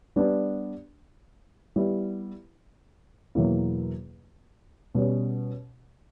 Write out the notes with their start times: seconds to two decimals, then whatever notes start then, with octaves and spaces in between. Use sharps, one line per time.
0.16 G3 B3 D4
1.76 G3 B3 E4
3.35 E2 B2 F#3 A#3 E4
4.95 B2 G3 C#4